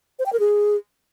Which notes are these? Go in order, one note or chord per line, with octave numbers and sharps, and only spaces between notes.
C5
G5
A#4
G#4